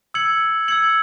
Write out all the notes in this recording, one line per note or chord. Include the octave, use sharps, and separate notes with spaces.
E6 G#6 C#7 F#7
E6 G#6 C#7 F#7